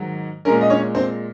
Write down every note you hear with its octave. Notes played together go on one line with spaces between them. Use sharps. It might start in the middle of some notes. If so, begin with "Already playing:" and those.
Already playing: G#2 D#3 F#3
A#2 G#3 C#4 A#4
D#5
C#4 C#5
C4 C5